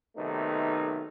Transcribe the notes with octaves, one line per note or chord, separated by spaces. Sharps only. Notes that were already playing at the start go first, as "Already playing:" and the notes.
B1 C3 D#3 A3 B3 D#4